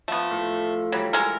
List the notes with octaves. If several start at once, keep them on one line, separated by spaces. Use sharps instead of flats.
F3 A3 B3
A2
E3 F#3 G3
G#3 A4 A#4